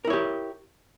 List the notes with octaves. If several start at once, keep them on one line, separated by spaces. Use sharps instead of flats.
E4 G4 A#4 C#5